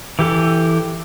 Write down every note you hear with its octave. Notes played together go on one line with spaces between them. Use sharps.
E3 G4 A4